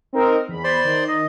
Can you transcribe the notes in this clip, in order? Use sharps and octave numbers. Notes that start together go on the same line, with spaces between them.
C4 D#4 A#4
E2 B5
C5 D5 C6
D#3
D#5